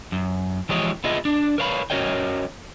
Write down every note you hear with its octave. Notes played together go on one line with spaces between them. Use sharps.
F#2
E3 F3 G#3 G4 C#5 D#5
B3 E4 F4 G#4 D#5
D4
A#4 B4 C#5 F5 G5 B5
C#4 F#4 A#4 C#5 D#5 G5